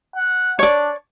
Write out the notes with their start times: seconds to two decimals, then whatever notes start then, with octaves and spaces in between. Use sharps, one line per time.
0.16 F#5
0.59 D4 C#5 D5